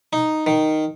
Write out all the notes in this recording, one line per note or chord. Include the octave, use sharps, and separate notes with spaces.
D#4
D#3